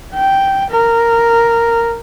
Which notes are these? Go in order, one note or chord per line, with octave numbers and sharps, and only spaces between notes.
G5
A#4